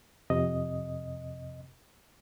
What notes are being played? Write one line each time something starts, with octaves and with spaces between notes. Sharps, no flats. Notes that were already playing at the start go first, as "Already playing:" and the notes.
F2 C3 D#5